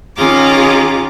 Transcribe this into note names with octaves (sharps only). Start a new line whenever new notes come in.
D#3 C#4 F4 G#4 A#5 D6